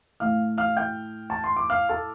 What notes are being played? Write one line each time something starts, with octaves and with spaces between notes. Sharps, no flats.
A2 A3 F5 F6
F5 F6
G5 G6
A5
C6
D6
F5 F6
A4 A5